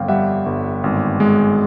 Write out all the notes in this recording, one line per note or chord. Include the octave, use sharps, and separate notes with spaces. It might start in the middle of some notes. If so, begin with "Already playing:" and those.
Already playing: G1 F2 F5 G5
G3 E5 F#5
G1
G#1
G#3